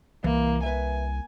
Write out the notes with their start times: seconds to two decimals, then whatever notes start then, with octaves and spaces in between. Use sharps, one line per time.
0.24 C2 E3 A#3
0.63 B4 E5 G#5